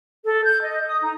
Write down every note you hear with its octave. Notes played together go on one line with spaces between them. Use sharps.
A4
G6
D#5
D#6
D#4